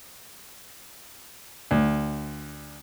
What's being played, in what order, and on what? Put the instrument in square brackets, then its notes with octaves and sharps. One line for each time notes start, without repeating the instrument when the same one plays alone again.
[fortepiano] D2